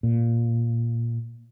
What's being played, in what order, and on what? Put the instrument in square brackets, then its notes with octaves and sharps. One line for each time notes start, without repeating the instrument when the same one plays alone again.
[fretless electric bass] A#2